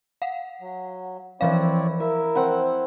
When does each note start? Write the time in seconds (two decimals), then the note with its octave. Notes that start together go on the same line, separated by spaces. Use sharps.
0.22 F5 F#5
0.61 F#3
1.41 E3 F3 C4 E4 C#5 D5 F5
2.00 E4 A#4 E5
2.35 C4 F#5 B5